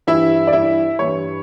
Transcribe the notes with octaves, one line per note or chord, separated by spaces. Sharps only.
G2 E3 G3 E4 E5
D5
E4 E5
G2 E3 G3 C#5